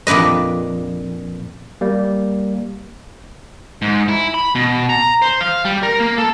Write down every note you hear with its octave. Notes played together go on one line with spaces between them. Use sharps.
F2 A#2 D4 B4 D#5
G3 A#3
G#2
E4
B5
B2
A#5
C5
F5
G3
A#4
A#3
A4